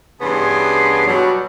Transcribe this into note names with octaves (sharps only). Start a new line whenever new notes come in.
G2 C#3 E3 B3 G#5 C6
B2 F#3 G3